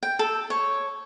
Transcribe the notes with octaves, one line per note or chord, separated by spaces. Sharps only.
G5
A4
C#5